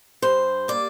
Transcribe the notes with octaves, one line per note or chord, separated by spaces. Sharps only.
G2 C5
A#3 D5